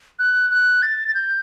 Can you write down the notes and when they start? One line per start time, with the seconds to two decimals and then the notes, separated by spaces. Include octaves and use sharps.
0.19 F#6
0.51 F#6
0.82 A6
1.08 A6
1.14 G6